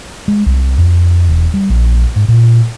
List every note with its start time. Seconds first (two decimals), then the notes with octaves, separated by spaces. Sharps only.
0.28 G#3
0.46 C2
0.78 F2
1.29 E1
1.54 G3
1.70 A#1
2.16 G#2
2.28 A#2